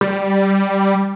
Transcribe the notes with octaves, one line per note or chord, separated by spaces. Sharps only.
G3